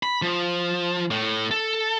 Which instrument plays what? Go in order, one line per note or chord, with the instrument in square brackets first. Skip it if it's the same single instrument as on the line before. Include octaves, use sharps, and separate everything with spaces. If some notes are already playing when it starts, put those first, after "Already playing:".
[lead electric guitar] B5
F3
A2
A4